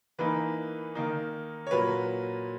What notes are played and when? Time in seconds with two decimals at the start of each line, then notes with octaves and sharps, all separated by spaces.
0.18 E3 A#3 D#4 B4
0.95 D#3 A#3 D#4
1.67 C#5
1.71 A#2 F#3 A#3 B4